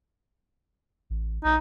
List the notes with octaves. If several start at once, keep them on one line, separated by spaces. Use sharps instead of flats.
A1
A#1 D#4